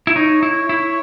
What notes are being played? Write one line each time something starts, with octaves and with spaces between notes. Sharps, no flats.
E4
D#4 C#5
E4
E4